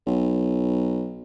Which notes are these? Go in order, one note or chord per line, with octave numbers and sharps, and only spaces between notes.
B1